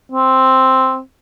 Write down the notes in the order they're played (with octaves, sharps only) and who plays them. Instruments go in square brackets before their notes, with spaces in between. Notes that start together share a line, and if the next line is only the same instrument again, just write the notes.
[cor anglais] C4